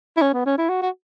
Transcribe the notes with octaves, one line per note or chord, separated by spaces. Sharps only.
E4
C#4
B3
C#4
E4
F#4
F#4